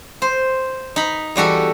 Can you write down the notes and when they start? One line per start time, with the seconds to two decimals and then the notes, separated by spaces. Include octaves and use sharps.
0.22 C5
0.96 D#4 B5
1.36 E2 G3 F#4 A4